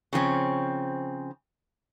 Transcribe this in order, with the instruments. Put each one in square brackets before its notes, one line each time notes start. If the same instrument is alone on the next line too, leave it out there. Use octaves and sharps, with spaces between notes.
[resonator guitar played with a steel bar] C#3 F3 C4 C#4